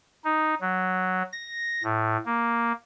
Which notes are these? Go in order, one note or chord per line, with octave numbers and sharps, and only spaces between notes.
D#4
F#3
A#6
A2
A#3